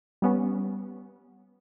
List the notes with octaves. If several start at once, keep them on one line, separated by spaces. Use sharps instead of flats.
G3 B3 C#4